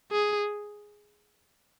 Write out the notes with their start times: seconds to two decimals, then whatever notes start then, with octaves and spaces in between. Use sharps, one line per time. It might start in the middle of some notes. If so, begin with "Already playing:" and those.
0.12 G#4